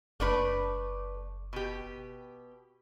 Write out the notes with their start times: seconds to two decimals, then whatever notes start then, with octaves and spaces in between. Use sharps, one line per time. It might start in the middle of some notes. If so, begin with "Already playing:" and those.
0.20 F#1 A3 D4 B4
1.53 B2 G4